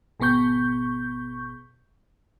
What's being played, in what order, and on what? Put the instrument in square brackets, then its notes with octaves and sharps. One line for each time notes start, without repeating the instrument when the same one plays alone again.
[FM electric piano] G#1 B2 B3 C#6 G6